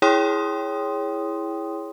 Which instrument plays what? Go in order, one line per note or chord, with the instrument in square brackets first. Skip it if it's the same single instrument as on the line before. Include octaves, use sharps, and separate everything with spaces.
[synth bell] E4 G#4 C#5 G5 C6 D#6